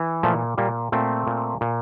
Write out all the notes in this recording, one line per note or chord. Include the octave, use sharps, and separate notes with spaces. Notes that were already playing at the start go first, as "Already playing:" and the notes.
Already playing: E3
A#2 F3 A3
A#2 G3 A#3
A#2 A3 C4
A#2
A#2